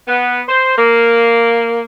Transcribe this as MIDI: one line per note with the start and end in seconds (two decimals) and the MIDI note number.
0.08 0.41 59
0.47 0.72 72
0.77 1.82 58